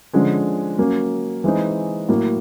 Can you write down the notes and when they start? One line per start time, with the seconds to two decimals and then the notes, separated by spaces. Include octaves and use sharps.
0.13 D3 F3 G#3 C#4
0.78 F#3 A#3 C#4
1.44 E3 G#3 C4 D#4
2.09 A2 F#3 A#3